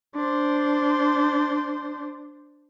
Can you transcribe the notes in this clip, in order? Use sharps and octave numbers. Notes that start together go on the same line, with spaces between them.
D4 C5